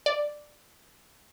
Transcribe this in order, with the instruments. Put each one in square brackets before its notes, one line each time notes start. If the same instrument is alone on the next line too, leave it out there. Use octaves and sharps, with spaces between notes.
[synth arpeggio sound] D5